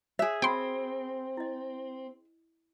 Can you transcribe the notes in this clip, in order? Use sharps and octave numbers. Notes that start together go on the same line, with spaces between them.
G#4 C#5 E5
C4 F#4 G5 B5 C6
E4 D#5